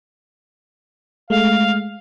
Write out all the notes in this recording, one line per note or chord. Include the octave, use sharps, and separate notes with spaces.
G#3 A3 F5